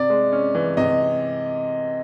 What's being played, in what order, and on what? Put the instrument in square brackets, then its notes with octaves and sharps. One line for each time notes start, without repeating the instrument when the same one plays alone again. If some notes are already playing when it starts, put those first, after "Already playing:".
Already playing: [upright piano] C3 [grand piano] D5
[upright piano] G#3
C#4
E3
[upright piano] C3 [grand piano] D#5